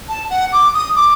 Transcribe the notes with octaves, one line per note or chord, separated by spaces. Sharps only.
A5
F#5
D6
D#6
D6